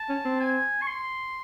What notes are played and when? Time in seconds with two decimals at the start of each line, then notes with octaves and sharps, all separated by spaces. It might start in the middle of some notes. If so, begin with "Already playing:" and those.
Already playing: A5
0.09 C#4
0.25 C4
0.40 G#5
0.82 C#6
0.87 C6